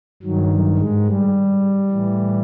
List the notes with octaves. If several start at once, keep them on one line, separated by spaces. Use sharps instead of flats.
G2 D#3 F#3
G#2 G#3
G3
A2 E3